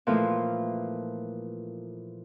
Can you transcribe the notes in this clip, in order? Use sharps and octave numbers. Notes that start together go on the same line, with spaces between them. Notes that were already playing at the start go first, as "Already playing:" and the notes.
A#2 E3 F3 A3 A#3